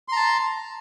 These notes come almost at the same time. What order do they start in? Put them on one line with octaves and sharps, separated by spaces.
C6 A#5 A5